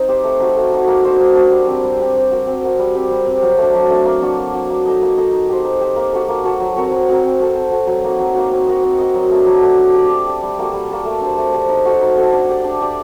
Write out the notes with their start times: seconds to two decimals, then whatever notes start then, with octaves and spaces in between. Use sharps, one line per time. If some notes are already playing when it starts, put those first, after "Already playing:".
Already playing: C4 D#4
0.08 G4 C5
0.24 A3
0.40 D#4 F#4
0.56 A3
0.72 D#4 F#4
0.87 A#3
1.04 D4 F#4 C5
1.19 A#3
1.35 D4 F#4 C5
1.52 G3
1.67 C4 G4
1.84 G3
2.00 C4 G4
2.16 C4
2.31 F#4 A#4
2.47 C4
2.63 F#4 A#4
2.79 G3
2.95 C4 G4
3.11 G3
3.26 C4 G4
3.42 F#3
3.58 A3 D4
3.74 F#3
3.90 A3 D4
4.05 A#3
4.22 D4 F#4
4.38 A#3
4.54 D4 F#4
4.70 A#3
4.85 D#4 A4 D#5
5.02 A#3
5.17 D#4 A4 D#5
5.32 D#4
5.48 G4 C5
5.65 D#4
5.81 G4 C5
5.96 A#3
6.13 F#4 A4
6.28 A#3
6.44 F#4 A4
6.60 F#3
6.76 C4 F#4 A#4
6.92 F#3
7.09 C4 F#4 A#4
7.23 C4
7.40 F#4 A4
7.55 C4
7.71 F#4 A4
7.87 F#3
8.04 A#3 D#4 F#4
8.19 F#3
8.35 A#3 D#4 F#4
8.52 C4
8.67 F#4 A#4 D#5
8.83 C4
8.98 F#4 A#4 D#5
9.15 F#3
9.31 A3 D4
9.46 F#3
9.62 A3 D4
9.78 D4
9.94 G4 D5
10.10 D4
10.27 G4 D5
10.43 G3
10.58 A#3 F#4 A4
10.73 G3
10.90 A#3 F#4 A4
11.05 A3
11.21 D4 G4 C5
11.38 A3
11.53 D4 G4 C5
11.69 D#4
11.85 F#4 A4 D#5
12.01 D#4
12.17 F#4 A4 D#5
12.32 D4
12.49 G4 D5
12.64 D4
12.81 G4 D5